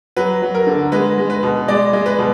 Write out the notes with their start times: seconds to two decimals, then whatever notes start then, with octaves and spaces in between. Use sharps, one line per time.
0.17 F#3 B4
0.42 F#3
0.55 A#4
0.67 D3
0.92 G#3 B4
1.18 G#3
1.30 B4
1.43 B2
1.68 G#3 D5
1.93 G#3
2.06 B4
2.19 B2